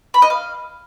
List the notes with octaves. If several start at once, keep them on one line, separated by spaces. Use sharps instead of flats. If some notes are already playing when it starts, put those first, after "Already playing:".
B5
D#5
F5